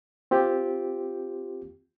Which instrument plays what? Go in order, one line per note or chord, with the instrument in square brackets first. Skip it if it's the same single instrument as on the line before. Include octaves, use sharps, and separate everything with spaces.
[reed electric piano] C4 F4 G4